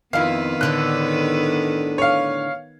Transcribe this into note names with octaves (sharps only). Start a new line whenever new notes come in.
F2 D#3 B3 E4 B4 F5
A2 D3 D5 F#6
C#5 F5